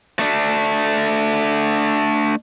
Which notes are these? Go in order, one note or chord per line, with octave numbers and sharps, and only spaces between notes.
A3 D4